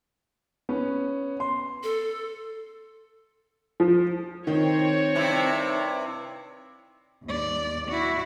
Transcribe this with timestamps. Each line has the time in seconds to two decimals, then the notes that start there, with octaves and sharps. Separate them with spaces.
0.69 B3 C#4
1.40 C6
1.83 A4
3.80 F3
4.47 D#3 C4 C#5
5.15 G2 C3 E4
7.24 D#2 D5
7.88 E4 F#4